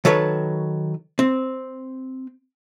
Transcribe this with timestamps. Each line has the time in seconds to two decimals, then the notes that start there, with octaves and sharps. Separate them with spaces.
0.05 D#3 F#3 A4 B4 C#5
1.19 C4